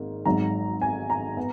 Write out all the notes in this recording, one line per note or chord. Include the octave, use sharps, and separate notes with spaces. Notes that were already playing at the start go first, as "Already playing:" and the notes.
Already playing: G#1 G#2 A#3
G#1 G#2 F#3 A#5
G#5
A#5
B3